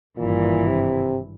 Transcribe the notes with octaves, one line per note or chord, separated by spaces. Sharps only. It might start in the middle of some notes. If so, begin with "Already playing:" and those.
G#1 G2 A#2 E3
C3